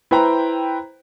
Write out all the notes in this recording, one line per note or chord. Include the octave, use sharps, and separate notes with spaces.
E4 B4 C5 G5 A#5